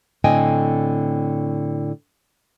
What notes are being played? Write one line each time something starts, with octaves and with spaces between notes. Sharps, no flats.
A2 D3 C4 D#5 G5 G#5